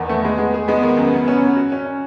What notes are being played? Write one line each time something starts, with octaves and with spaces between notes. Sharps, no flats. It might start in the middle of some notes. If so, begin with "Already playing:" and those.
Already playing: E2 D#3 B3
A3
G#3
G#3
G#4
G#3 B3
D#3
F#2
C#3
C#4
C#3
F#4
C#4
C#4